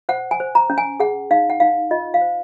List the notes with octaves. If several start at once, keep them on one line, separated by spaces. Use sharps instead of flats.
C5 F#5
G#5
C5
A#5
C#4
G#5
G#4 F#5
D#4 F5
F#5
D#4 F5
F4 D#5
F5
C5